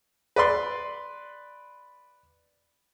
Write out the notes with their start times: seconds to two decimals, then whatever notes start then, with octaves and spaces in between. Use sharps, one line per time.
0.36 B4 D5 C6